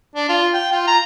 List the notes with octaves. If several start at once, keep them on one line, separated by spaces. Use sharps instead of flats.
D4
F4
G5
F4
A#5